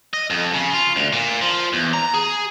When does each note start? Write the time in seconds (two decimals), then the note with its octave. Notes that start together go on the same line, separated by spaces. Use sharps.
0.13 D#5
0.30 F2
0.54 C#3
0.74 F4
0.96 D2
1.13 A#2
1.41 F3
1.73 E2
1.94 A#5
2.14 G#4